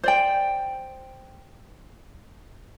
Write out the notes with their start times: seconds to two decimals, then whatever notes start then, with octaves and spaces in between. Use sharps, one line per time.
0.03 C5 D5 G5